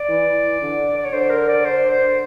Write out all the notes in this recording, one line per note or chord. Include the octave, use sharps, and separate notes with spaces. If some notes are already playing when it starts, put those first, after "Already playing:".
Already playing: D5
E3
D3
D5
C#5
D3 C5
A#4
D5
C5
C5